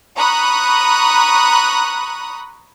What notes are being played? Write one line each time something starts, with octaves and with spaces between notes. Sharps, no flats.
A#5 B5 C#6 D#6 F#6